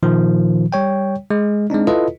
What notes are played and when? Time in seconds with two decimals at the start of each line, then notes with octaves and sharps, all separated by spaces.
0.03 A#2 D#3 F3
0.72 G3 C#5 G5
1.30 G#3
1.70 G#3 C4 D4 D#4
1.87 E4 F4 A4 B4 D#5